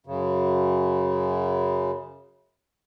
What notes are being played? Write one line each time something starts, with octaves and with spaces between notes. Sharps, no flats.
F#2 C#3